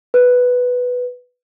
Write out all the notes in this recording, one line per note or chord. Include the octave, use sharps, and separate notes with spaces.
B4